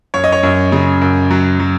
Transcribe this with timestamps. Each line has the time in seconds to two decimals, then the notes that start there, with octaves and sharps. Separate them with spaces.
0.14 F#2 C#5
0.24 D#5
0.32 C#5
0.43 F#2
0.72 C#3
1.01 F#2
1.31 F#3
1.60 F#3